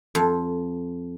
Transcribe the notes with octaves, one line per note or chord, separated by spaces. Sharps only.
F2